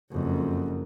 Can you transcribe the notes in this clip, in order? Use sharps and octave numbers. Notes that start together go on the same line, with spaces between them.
F#1 F2